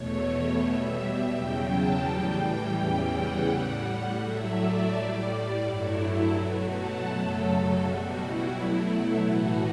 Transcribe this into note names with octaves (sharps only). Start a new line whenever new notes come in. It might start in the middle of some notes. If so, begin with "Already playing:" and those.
Already playing: E2 B2 A3 C#5
B2 G3 E5
E2 C#3 F#3 G5
A5
A2 E3 G3 G5
E2 C#3 E3 G3
F#5
A2 G3
F#5
A2 F#3 A3 E5
D5
A2 G3
G2 F#3 A3 E4
B2 F#3 A3 F#4
A4
F#2 C#3 F#3 A3
B2 G3 F#4
E4
B2 F#3 A3
A2 E3 A3 F#4